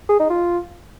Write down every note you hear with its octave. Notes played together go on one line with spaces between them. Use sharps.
G#4
D#4
F4